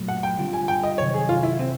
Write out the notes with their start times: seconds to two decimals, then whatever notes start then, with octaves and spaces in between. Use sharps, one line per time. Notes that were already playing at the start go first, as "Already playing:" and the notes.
Already playing: A#2 F#3 A3
0.08 F#5
0.23 G5
0.38 D3 G3 C4 F4
0.53 G#5
0.68 G5
0.83 D#5
0.98 C3 D#3 F#3 C#5
1.14 G#4
1.29 F4
1.43 E4
1.58 C3 E3 C4